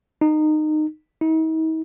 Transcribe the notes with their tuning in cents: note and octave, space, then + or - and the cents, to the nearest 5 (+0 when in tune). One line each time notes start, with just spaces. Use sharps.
D#4 -20
D#4 +45